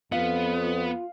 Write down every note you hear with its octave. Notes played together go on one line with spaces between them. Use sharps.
F2 B3 F4 F5